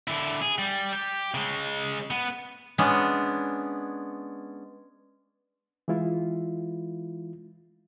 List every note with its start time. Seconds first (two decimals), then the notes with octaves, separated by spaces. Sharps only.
0.08 D3 E4
0.41 G#4
0.58 G3
0.93 G4
1.34 C#3 G#3
2.10 B3
2.78 G#3 B3 C#4 D4
5.88 E3 G#3 E4 F4